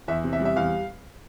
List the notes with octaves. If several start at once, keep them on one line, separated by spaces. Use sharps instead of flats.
E2 E5
C3
E5
G3
E5
E2 F5